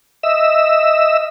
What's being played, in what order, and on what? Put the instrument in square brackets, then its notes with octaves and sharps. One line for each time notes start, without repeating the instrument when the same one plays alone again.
[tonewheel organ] D#5 E5 E6